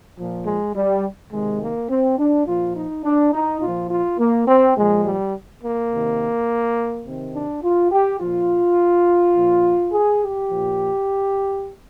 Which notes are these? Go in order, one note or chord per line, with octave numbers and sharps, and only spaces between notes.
A#2 F3
G#3
G3
C3 D#3 G#3
A#3
C4
D4
A#2 F3 F4
D#4
D4
D#4
A#2 F3 F4
F4
A#3
C4
A#2 F3 G#3
G3
A#3
C3 D#3
C3 D#3 C4
D4
F4
G4
A#2 F3 F4
A#2 F3
G#4
G4
A#2 F3